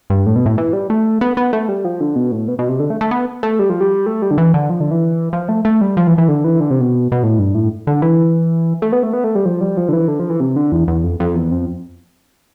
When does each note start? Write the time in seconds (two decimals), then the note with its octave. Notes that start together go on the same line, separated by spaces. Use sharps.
0.10 G2
0.26 A2
0.36 B2
0.46 A2
0.58 E3
0.73 G3
0.90 A3
1.21 B3
1.37 B3
1.53 A3
1.69 G3
1.85 F3
2.01 D3
2.16 B2
2.32 A2
2.48 B2
2.59 B2
2.69 C3
2.80 D3
2.90 A3
3.01 A3
3.11 B3
3.43 A3
3.59 G3
3.70 F3
3.81 G3
4.06 A3
4.22 G3
4.31 D3
4.38 E3
4.54 D3
4.70 F3
4.80 D3
4.91 E3
5.33 F3
5.49 A3
5.65 A3
5.81 G3
5.97 F3
6.07 E3
6.18 E3
6.28 D3
6.44 E3
6.60 D3
6.70 C3
6.81 B2
7.12 B2
7.23 A2
7.39 G2
7.55 A2
7.87 D3
8.02 E3
8.82 A3
8.92 B3
9.03 A3
9.13 B3
9.24 A3
9.35 G3
9.45 F3
9.61 G3
9.77 F3
9.89 D3
9.93 E3
10.08 D3
10.20 F3
10.29 E3
10.40 C3
10.56 D3
10.72 E2
10.88 E2
11.04 F2
11.20 F2
11.35 E2
11.51 F2